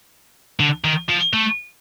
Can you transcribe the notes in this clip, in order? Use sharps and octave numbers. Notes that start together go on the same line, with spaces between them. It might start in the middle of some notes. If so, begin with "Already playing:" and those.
D3
D#3
F3
A3